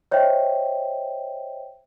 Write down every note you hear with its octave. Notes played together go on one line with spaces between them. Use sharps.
C5 C#5 D#5 E5 G5